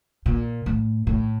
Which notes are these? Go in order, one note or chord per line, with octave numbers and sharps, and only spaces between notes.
A#2
A2
A2